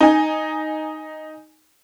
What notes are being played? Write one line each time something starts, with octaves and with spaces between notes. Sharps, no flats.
D#4 G#5